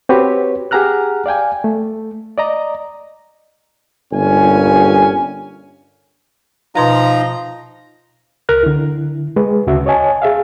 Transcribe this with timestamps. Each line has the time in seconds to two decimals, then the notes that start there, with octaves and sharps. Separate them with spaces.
0.09 C4 F#4 G4 B4 C#5
0.71 G4 G#4 F#5 A#5 F6 F#6
1.26 D5 F5 G5 G#5
1.64 A3
2.38 D5 D#5 A#5
4.13 G1 G2 A#2 G3 C#4 G#5
6.75 B2 F3 D#4 B4 F5 A#5
8.49 C#2 A#4 F6 F#6
8.63 D3 E4
9.36 G#3 B4
9.67 D2 C#3 F#4 E5
9.86 C#5 D#5 G#5 A5
10.22 G#4 E5 F5